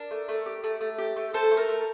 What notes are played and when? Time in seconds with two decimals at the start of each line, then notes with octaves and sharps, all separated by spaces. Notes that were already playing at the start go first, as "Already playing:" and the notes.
Already playing: D4 A#4 D5
0.11 A3
0.29 A3
0.46 G4
0.64 A3
0.81 A3
0.98 G4
1.16 A3
1.34 A3 A4 C5
1.51 A3
1.57 A#4
1.69 A3